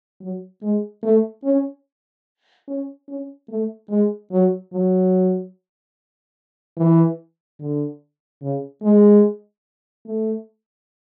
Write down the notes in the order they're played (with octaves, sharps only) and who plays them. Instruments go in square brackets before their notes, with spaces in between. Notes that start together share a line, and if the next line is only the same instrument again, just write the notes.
[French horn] F#3
G#3
A3
C#4
C#4
C#4
A3
G#3
F#3
F#3
E3
D3
C#3
G#3
A3